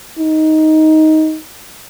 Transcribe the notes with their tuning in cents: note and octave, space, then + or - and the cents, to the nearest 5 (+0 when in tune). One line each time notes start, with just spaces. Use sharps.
D#4 +10